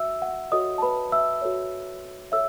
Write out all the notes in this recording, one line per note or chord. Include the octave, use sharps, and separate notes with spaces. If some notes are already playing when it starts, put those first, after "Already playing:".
Already playing: F#4 E5 E6
F#5
F#4 A4 C#5 D#5 D#6
A5
B4 B5
E5 E6
F#4 A4 C#5
A4 C#5 E5 E6